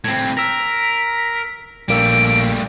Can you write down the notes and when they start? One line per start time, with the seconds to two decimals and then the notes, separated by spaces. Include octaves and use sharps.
0.04 A2 C4 G#6
0.37 A#4 E6 A#6 B6
1.88 A#1 G3 A3 A#3 E6 D7